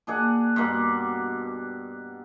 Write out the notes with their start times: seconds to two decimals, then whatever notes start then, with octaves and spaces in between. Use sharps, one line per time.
0.07 A#2 D4 G#4 F#5
0.56 G2 B2 A#3 F#5